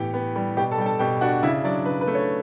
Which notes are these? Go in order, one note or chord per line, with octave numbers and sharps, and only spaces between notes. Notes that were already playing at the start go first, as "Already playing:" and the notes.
Already playing: A2 E3 B3 G4 G5
B3
G3
B2 G4 G5
A4 A5
G3 G5
A4 A5
B2 G4 G5
D4 F#4 F#5
C#3 E4 E5
F#3 D4 D5
C#3 B4
B4
A3
C#5